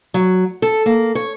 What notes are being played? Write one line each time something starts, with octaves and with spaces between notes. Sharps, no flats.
F#3
A4
A#3
C#5